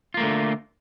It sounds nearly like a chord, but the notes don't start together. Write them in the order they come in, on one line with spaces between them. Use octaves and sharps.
F4 A#3 A3 D3